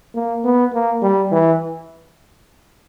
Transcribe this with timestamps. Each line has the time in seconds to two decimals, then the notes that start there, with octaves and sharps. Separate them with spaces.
0.14 A#3
0.44 B3
0.73 A#3
1.02 G3
1.31 E3